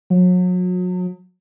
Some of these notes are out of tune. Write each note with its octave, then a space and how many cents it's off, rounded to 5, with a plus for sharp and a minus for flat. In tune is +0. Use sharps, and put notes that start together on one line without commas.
F#3 -35